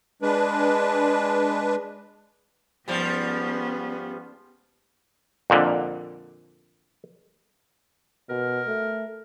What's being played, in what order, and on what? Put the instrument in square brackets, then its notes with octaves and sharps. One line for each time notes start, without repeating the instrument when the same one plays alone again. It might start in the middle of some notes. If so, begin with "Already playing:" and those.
[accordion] G#3 D4 B4
[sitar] G#2 F3 G3 [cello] B3 C#4
[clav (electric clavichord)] F2 A#2 D3
[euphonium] B2 [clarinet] A#4
[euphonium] A3